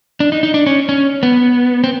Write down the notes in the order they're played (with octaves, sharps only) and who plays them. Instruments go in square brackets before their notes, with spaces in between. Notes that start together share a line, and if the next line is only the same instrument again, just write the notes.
[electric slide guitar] D4
D#4
D#4
D4
C#4
C#4
B3
C4